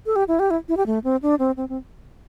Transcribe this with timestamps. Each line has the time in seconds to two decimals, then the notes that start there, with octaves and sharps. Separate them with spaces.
0.06 A4
0.16 G4
0.28 E4
0.39 G4
0.51 E4
0.68 E4
0.77 G4
0.86 A3
1.04 C4
1.22 D4
1.39 C4
1.57 C4
1.69 C4